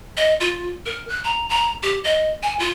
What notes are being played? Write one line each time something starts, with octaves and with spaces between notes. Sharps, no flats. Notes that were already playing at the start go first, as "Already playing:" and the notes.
D#5
F4
A#4
F#6
A#5
A#5
G4
D#5
G#5
F4